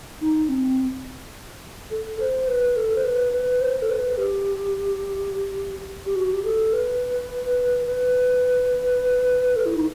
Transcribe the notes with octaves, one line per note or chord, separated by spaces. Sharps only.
D#4
C4
A4
C5
B4
A4
C5
B4
B4
C5
A4
B4
G4
G4
F#4
G4
A4
B4
B4
A4
E4
D#4